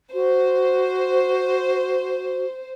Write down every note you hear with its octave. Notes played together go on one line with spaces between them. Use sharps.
F#4 C5